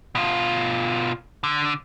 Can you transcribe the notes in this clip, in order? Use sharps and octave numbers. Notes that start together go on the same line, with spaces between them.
B2 F4
D3